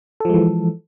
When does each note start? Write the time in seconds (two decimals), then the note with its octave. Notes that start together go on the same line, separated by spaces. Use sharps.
0.20 A4
0.25 F3
0.29 G#3
0.34 E3